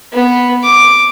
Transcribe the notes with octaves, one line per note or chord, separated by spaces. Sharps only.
B3
D6